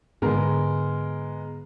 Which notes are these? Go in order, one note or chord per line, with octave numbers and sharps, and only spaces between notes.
G#2 D3 G#3 B3 A#4